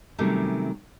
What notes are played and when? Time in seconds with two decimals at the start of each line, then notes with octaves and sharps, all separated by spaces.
0.18 C3 D#3 F#3 G3 A3 C#4